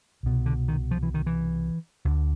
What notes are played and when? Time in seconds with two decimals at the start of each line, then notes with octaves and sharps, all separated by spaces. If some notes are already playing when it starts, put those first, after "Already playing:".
0.23 C2 B2
0.46 D3
0.68 D#3
0.91 F3
1.03 E3
1.14 D#3
1.27 E3
2.05 D2 D3